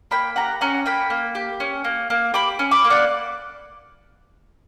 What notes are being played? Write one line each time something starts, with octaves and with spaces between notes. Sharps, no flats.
A#3 G5 B5
G4 F#5 A#5
C#4 F#5 A#5
A#3 G5 B5
A#3
G4
C#4
A#3
A#3
G4 B5 D6
C#4
B5 D6
A#3
D5 F#5